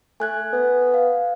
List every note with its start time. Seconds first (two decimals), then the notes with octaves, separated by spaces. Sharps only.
0.20 A3 G#5 F#6 G#6
0.53 B3
0.94 F5